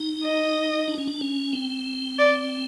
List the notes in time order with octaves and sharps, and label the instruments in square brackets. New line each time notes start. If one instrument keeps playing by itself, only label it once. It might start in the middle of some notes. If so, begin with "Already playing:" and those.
Already playing: [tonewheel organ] D#4
[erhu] D#5
[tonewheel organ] D4
C#4
D4
C#4
C4
[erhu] D5